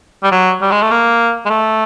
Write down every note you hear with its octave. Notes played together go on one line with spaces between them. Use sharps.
G3
F#3
G3
G#3
A3
A#3
G#3
A3